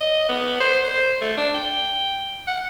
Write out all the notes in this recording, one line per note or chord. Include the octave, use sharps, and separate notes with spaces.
D#5
B3
C5
C5
A3
D4
G5
F#5